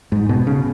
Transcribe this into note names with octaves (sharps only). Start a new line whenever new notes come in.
G#2
B2
C#3